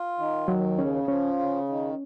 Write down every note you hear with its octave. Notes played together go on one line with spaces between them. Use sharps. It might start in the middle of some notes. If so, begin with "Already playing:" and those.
Already playing: F4
D#3
D#2 F#3
C#3 C#4
F3 C#4
C#3
D#3